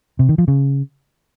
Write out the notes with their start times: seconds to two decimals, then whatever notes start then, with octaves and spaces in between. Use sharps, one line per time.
0.19 C3
0.29 D#3
0.38 F3
0.48 C#3